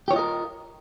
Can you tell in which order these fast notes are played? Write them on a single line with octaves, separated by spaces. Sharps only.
G4 C#5 F4 D#5 A#4